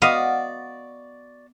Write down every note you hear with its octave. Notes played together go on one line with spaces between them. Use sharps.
B3 F#4 D5 D#5 F5 D#6